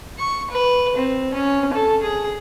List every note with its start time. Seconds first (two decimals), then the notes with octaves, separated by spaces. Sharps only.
0.19 C#6
0.51 B4
0.96 C4
1.34 C#4
1.73 A4
2.02 G#4